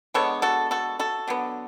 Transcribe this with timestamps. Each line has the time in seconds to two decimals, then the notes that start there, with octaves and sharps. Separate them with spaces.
0.14 D3 G#3 B3 A4 C#5
0.42 F#4 A4
0.71 F#4 A4
0.99 F#4 A4
1.27 D3 F#3 B3